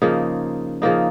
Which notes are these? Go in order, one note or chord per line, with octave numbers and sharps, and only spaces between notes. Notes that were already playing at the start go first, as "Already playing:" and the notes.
C#3 F3 A#3 D#4
C#3 F3 A#3 D#4